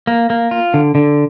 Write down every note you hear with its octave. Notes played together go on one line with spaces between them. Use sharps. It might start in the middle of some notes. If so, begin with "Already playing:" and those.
A#3
A#3
F4
D3
D3